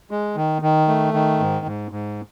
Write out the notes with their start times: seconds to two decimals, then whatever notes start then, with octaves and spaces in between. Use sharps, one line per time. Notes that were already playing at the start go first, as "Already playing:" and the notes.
0.11 G#3
0.36 D#3
0.62 D#3
0.88 A3
1.14 D#3
1.40 G#2
1.66 G#2
1.91 G#2